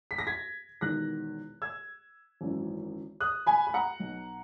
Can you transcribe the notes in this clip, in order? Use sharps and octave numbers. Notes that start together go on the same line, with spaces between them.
B6
A#6
G#6 B6
E1 E2 D#3 F#6 A#6
E6 G#6
G#1 F#2 E3
D#6 F#6
G#5 B5
B5
F#5 A#5
B1 B2